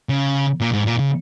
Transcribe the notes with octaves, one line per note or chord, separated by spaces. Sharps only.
C#3
A#2
G#2
A#2
C#3